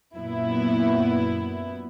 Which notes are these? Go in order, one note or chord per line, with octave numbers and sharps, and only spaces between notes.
F#2 A#2 B3 E4